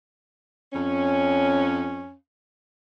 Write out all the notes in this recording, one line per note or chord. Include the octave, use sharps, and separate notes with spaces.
F2 C#4